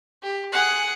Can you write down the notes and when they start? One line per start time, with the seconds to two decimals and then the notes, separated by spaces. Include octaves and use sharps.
0.23 G4
0.53 G#4 F#5